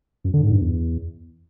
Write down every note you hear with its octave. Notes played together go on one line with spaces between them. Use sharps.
F#2
D3
G#2
G2
E2